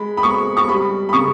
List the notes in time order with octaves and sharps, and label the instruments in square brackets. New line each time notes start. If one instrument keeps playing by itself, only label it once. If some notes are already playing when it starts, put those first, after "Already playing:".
Already playing: [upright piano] G#3 B5
B5
G#3 C#6
C#6
G3 B5
B5
C#3 C#6